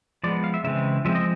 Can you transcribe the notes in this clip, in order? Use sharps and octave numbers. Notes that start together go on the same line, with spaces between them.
F3 G#3 B3 D5
F5
E5
C#3 E3 G#3 C4 E5
F3 G#3 C4 E5
D#5